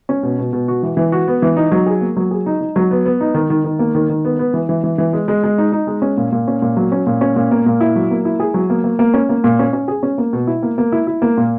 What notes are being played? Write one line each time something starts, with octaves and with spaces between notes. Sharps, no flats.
C#4
B2
B2
B2
F#4
E3
E3
F#4
B3
E3
D#4
F#3
G#4
A#3
F#3
G#4
D#4
D#4
F#3
B3
B3
D#4
D#3
D#3
D#3
A#3
D#3
D#3
B3
B3
E3
E3
E3
E3
G#3
G#3
G#3
D#4
D#4
G#3
C#4
A#2
A#2
C#4
A#2
F#3
C#4
A#2
C#4
A#2
A#3
A#2
E4
F#3
A#3
E4
G#4
F#3
A#3
A#3
A#3
C#4
A#3
A#2
C#4
C#4
G#4
C#4
A#3
B2
E4
A#3
A#3
E4
E4
A#3
A#2